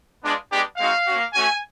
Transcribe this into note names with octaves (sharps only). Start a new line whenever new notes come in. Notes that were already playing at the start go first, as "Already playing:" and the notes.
G#3 B3 D4 F4
G#3 B3 D4 G4
G#3 C4 D#4 F#4 F5
A#3 C#4 F#4
A3 C#4 F#4 G#5